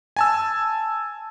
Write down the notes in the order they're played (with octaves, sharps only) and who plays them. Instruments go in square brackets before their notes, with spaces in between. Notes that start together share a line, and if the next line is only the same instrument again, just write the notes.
[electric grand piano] G#5 A5 E6